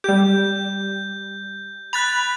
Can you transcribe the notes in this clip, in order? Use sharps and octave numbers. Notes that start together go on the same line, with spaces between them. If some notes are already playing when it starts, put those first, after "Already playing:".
G3 G4 G6
B5 F#6 A6 F7